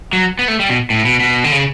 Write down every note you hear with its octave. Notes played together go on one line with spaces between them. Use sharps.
F#3
B3
A3
G3
B2
A2
B2
B2
D3
C#3